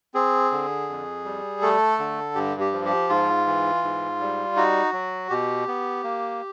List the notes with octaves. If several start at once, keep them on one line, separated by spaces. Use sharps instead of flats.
C4 G#4
D3
F2
G3
A3 A4
D3
G2 G4
G4
F3
G4
G#2 F4
E3
G#2
G3
D#4 F#4
F#3
B2 G4
B3
A#3